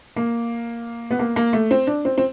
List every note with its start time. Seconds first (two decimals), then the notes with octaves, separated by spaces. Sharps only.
0.16 A#3
1.11 B3
1.19 A#3
1.36 A#3
1.53 A3
1.71 C4
1.87 D4
2.05 C4
2.18 C4